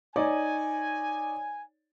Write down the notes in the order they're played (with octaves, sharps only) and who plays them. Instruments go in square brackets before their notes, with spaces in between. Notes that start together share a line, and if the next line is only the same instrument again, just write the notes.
[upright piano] D#4 C#5 D5 [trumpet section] G#5